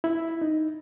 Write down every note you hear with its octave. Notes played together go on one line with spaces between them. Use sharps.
E4
D#4